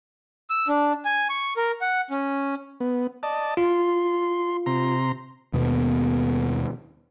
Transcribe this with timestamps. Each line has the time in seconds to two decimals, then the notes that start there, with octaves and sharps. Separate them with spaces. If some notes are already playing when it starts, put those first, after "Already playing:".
0.50 E6
0.68 D4
1.05 G#5
1.30 C#6
1.57 A#4
1.81 F#5
2.10 C#4
2.80 B3
3.23 D5 D#5 A5
3.57 F4 C6
4.66 C3 A#5 C6
5.53 D#2 B2 B3